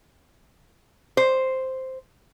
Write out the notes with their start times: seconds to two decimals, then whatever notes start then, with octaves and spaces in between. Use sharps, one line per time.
1.17 C5